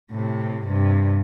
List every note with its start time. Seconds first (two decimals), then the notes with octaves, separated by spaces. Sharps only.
0.11 A2 C3
0.66 G2 C3